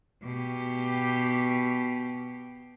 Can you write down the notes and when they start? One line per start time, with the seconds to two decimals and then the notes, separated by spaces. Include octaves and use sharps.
0.23 B2 G4